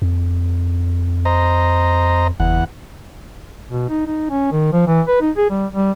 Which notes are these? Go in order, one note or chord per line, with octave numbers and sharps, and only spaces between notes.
F2
C5 D#5 A#5
F#1 E2 F#5
B2
D#4
D#4
C#4
D#3
F3
E3
B4
D#4
G#4
G3
G3